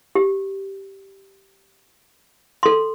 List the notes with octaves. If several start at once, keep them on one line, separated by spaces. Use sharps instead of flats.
G4
A4 C6